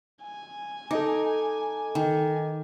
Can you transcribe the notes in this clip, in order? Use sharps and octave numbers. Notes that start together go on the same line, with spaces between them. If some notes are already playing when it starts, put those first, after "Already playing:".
G#5
D#4 A4 D#5 D6
D#3